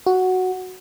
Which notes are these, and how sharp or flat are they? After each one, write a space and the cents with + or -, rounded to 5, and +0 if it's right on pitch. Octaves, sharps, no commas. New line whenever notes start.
F#4 +0